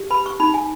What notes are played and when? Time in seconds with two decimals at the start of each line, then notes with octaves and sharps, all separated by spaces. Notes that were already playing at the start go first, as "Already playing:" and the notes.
Already playing: G4
0.10 B4 B5
0.26 C#6
0.40 D#4 B5
0.54 G#5